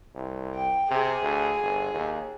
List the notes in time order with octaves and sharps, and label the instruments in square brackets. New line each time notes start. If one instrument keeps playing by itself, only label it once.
[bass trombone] C2
[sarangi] G5
[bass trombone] C3 [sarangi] G#4
[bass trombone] D2
G1
D#2